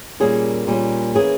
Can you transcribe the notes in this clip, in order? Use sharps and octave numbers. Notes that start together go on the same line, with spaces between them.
A#2 G3 A#3 C#4 G#4
A#2 G3 A#3 C#4
E3 A#3 C#4 G#4